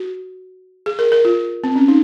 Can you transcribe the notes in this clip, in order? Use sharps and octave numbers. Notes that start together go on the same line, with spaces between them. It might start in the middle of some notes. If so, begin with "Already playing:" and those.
Already playing: F#4
G#4
A#4
A#4
F4
C4
C#4
D#4